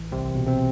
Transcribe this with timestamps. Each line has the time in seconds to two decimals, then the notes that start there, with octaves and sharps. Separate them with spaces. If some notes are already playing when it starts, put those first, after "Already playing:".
Already playing: A1 E3
0.12 C2 C3 C4
0.35 B2
0.47 C3 C4